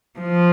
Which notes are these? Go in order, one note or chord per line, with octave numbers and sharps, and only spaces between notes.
F3